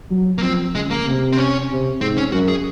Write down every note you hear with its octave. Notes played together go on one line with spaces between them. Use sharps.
F#3
A#3
F3 C4
C#3 G#3
A#3
C3
C4
C#4
C3
G#2 C4
C#4
F#2 F#4
G#4